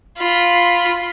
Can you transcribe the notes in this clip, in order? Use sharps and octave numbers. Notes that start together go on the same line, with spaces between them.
F4 B5